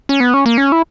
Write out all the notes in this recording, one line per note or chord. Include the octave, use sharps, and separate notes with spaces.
C#4
B3
C#4
A#3
C#4
E4